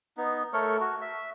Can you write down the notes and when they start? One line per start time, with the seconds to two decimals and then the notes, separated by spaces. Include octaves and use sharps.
0.17 B3 D#4
0.53 A3 A4 A#4 C#5
0.81 F#4
1.01 E5